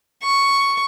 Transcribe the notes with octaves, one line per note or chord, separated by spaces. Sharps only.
C#6